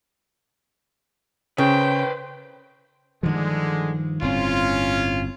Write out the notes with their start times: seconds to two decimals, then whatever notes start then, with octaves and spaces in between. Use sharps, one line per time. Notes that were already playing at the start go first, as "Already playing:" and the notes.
1.58 C#3 B4 C5 G5
3.23 G2 D3 D#3 F3 G#3
4.22 G1 A2 C4 C#4 F4